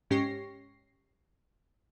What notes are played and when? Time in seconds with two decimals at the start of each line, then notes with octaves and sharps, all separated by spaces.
0.11 G#2 C#4 G4 C#6 A#6 C7